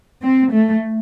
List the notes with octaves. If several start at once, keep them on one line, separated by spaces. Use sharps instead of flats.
C4
A3